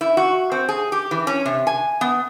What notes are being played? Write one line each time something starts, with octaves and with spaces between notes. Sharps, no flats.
E4
F#4
C4
G#4
G4
E3
C#4
C3
G#5
B3